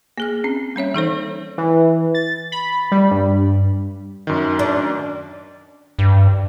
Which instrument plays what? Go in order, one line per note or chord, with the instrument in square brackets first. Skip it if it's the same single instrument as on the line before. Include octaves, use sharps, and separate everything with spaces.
[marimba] A#3 G#4 F6
C4 C#4
G3 C#4 C#5 E5
E3 D#4 A4 C5
[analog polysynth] E3
A6
B5
G3
G2
[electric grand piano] F#2 D#3
[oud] D4
[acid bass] G2